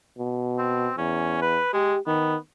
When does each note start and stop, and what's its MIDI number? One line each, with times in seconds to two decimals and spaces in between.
0.18 0.90 47
0.58 0.97 60
0.98 1.59 40
0.98 1.38 61
1.42 1.72 71
1.73 1.94 56
1.73 1.99 67
2.07 2.36 51
2.07 2.35 59